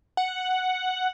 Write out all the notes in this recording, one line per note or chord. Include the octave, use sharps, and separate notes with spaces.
F#5